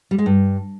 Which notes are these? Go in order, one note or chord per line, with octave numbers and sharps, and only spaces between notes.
G3
G#3
G2